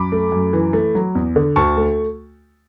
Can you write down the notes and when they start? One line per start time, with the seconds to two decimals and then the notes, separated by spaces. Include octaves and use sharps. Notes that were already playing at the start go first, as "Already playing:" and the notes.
Already playing: F#2 B5 D6
0.12 A3
0.32 F#2
0.53 E3
0.73 A3
0.95 F#3
1.15 E2
1.36 D3
1.56 D2 A5 C#6
1.77 A3